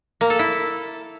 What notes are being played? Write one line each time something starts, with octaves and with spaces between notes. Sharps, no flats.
A#3
A4
E4